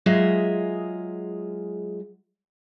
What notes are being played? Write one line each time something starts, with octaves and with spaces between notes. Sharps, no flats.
F#3 G#3 F4 G#4 D#5 E5